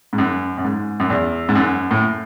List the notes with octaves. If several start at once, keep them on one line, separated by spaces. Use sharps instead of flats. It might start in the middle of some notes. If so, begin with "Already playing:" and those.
G#2
F#2
F#2
G#2
F#2
E2
G#2
F#2
A2